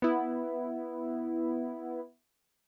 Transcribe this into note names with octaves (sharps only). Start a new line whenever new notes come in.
B3 E4